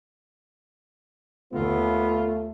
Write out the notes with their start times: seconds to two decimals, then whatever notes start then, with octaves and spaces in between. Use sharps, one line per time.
1.53 D#2 A3 B3 F4